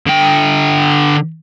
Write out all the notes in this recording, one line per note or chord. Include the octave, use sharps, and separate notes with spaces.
D3 G5